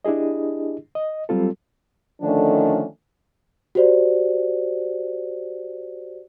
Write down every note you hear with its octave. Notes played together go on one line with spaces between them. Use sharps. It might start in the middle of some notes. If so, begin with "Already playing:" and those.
D4 E4 G4 G#4 D#5
D#5
F#3 G3 C4 F4 A4
D3 D#3 F3 A3 C#4 D4
F#4 G4 C5 D5